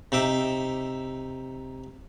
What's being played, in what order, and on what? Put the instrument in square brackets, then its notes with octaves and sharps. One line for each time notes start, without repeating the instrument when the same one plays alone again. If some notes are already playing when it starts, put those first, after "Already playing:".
[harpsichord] C3 D#4 E5 D6